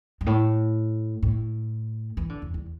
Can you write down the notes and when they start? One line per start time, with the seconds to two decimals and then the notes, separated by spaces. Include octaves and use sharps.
0.21 G2
0.26 A2
1.23 A2
2.17 E3
2.29 D3
2.42 E2
2.54 E2